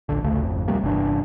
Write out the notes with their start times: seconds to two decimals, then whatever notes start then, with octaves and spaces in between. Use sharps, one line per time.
0.09 D#1 A#1 D3
0.24 G#1 D2 C#3 A3
0.41 G#1 F2
0.68 D#2 C3 G3 A#3
0.82 G1 C3 E3 D4